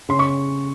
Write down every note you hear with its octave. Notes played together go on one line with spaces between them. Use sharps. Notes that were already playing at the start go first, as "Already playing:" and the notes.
C#3 C6
C#6